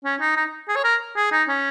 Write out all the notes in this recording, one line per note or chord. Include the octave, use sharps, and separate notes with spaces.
C#4
D#4
D#4
G#4
C#5
A#4
G#4
D#4
C#4